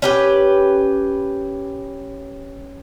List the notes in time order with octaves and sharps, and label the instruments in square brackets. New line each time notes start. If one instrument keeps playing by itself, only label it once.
[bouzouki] C#4 G4 B4